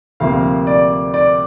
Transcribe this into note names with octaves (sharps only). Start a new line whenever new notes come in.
D2 C3 F3 A#3 F5
D5
D5